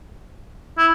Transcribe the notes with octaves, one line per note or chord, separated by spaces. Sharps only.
E4